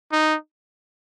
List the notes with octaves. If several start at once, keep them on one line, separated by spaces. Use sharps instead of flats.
D#4